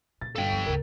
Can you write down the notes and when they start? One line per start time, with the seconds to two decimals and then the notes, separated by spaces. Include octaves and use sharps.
0.21 A#2 A6
0.36 G1 A4 F5 G5
0.53 F3
0.66 D2 C#3 A#4